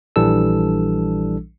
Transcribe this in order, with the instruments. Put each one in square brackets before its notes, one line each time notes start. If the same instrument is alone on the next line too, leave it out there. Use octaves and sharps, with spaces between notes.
[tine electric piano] A#1 E3 G3 D4 A4 E6